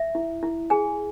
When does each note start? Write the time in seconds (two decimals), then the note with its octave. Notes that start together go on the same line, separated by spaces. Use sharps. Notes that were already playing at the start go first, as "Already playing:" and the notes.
Already playing: E5
0.15 E4
0.43 E4
0.70 G#4 G#5